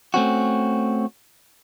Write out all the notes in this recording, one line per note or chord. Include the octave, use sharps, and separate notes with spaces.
A3 C4 C#4 F#4